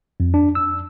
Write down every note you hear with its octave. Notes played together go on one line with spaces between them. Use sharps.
F2
D4
E6